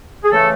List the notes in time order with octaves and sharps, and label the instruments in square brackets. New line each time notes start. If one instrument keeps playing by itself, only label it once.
[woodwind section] G#4
C#3 E3 A3 A4